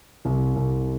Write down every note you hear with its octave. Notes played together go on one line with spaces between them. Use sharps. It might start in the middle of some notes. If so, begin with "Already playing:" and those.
C2
C2